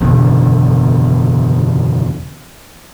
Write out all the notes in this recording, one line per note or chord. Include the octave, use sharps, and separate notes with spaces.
F#1 E2 B2 D3